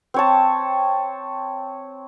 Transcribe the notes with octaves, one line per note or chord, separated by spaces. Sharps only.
C4 C#5 A5